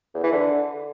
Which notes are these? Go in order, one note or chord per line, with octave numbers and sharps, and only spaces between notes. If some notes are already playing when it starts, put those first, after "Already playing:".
E2
E3
D3